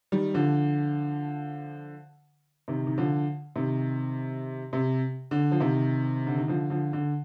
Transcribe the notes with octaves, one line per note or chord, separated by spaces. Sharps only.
D#3 G3
D3 F3
C3 D#3
D#3
D3 F3
C3 D#3
C3
D3
F3
C3 D#3
D3
D#3
D3 F3
D3 F3
D3